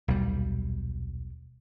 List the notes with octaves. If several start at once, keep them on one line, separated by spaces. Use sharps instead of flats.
D#1 B1 G3